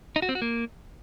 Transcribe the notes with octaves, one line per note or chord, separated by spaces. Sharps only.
D#4
F#4
C4
F#4
A#3